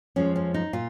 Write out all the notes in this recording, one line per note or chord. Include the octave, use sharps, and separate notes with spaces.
F2 F3 G#3 C#4
C#4
D#4
A#2 F4